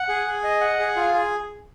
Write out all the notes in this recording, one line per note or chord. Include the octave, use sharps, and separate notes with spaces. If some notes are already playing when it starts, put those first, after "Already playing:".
Already playing: F#5
G#4
G#4
D#5
F#5
G#4
F4
G#4